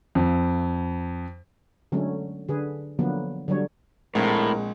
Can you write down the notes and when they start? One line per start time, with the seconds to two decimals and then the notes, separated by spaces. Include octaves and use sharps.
0.15 F2
1.92 D3 F#3 G#3 A3 C#4
2.49 D3 G#4 B4
2.99 D3 F3 F#3 A#3 B3
3.48 D3 F#3 G3 C#5
4.15 A#1 A2 G#3 C4 A#4 F5